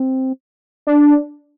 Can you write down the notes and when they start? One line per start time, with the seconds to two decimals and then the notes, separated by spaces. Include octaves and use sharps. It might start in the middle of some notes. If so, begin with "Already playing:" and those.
Already playing: C4
0.87 D4